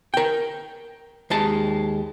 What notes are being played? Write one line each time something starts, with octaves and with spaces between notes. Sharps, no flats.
A#4 G5
D#2 G#3 A5